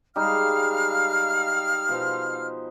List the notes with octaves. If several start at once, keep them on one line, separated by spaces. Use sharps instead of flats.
G3 G#3 D#4 F5 F6
B2 F3 C5